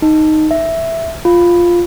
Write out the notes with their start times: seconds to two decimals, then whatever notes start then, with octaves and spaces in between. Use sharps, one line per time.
0.02 D#4
0.51 E5
1.25 F4